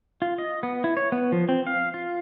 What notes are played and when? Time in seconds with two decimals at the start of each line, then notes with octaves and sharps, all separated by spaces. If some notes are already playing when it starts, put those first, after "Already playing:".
0.22 F4
0.38 D#5
0.63 B3
0.84 E4
0.97 C#5
1.12 B3
1.32 F3
1.49 C4
1.67 F5
1.94 F4